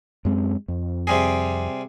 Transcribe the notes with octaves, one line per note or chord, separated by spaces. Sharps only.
F#2 G#3 C4
F2
C3 G3 G#4